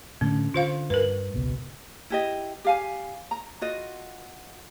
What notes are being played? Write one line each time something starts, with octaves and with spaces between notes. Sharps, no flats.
A2 D3 A3 C#4
D3 F4 C5 F5
G2 A#4 B4
G#1 C#2 B2
E4 G4 D#5
G4 F5 G#5
A#5
F4 F#4 D#5